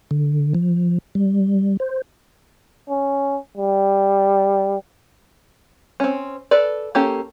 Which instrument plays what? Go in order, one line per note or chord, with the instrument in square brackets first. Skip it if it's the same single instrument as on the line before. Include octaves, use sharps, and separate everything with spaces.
[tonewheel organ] D3
F3
G3
C5
[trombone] C#4
G3
[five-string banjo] C4 C#4
A4 B4 D5
A#3 C#4 G4 A4